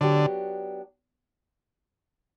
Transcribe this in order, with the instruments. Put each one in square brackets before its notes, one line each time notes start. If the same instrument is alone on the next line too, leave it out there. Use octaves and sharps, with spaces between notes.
[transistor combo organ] D3 [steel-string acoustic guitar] F#3 B3 D4 G4